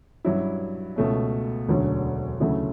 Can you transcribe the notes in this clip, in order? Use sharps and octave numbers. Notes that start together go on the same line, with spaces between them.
G2 F#3 C#4 E4
C#2 B2 A3 C#4
E1 D2 D3 F#3 C#4
D2 C#3 F#3 A3 E4